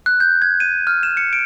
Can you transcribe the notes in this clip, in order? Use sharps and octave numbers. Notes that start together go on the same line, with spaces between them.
F#6
G6
G#6
D#7
F6
E7
C#7
D7